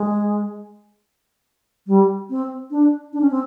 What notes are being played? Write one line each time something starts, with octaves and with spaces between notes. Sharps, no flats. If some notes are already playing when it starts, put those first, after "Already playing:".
Already playing: G#3
G3
C4
D4
D4
C#4
C4